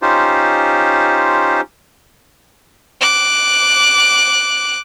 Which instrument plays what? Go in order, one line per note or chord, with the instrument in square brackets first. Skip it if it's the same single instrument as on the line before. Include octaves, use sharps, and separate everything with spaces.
[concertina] C#4 D#4 F4 G4 C5
[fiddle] D6 F#6